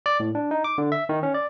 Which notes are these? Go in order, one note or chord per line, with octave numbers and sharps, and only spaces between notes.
D5
A2
D4
D#4
D6
D3
E5
D#3
C#4
D5